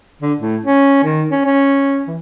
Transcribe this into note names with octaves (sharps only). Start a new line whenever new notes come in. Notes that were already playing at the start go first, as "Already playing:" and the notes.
D3
A2
C#4
D#3
C#4
C#4
E3